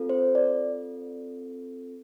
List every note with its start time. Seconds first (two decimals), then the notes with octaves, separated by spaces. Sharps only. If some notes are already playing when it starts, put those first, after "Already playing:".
Already playing: C4 F4 A4
0.09 C5
0.35 D5